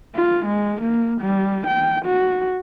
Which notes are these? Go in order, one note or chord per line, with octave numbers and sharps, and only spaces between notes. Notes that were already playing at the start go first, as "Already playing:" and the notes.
F4
G#3
A#3
G3
G5
F#4